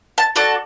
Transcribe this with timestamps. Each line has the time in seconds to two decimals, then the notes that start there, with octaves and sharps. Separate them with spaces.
0.18 A5
0.36 D4 F#4 A4 A5